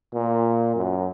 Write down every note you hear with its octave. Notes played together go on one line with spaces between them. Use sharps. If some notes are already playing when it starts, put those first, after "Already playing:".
A#2
F#2